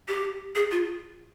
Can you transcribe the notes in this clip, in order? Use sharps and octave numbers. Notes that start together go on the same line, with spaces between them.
G4
G#4
F4